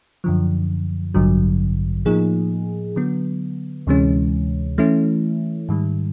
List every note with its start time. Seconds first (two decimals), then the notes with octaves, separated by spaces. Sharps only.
0.24 F#2 D3 F3
1.14 A1 G2 D3 F#3
2.05 A2 F3 A#3 D#4 G#4
2.96 D3 F#3 B3
3.87 D2 C3 E3 G#3 C#4
4.78 E3 A3 C#4 E4
5.69 G#2 D#3 G3